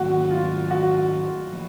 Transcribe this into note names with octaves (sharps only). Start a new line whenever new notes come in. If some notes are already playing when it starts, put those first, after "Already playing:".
Already playing: G#2 D#3 F#3 A#3 F#4
F4
F#4
F3 A#3